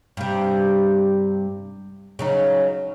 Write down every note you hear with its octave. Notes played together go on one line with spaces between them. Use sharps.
G2 C3
C#3 F#3 D#4